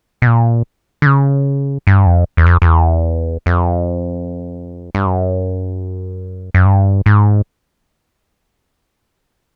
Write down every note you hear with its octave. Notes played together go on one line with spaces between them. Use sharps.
B2
A#2
D3
C#3
G2
F2
E2
F2
F2
E2
F2
G2
F#2
F#2
G2
G#2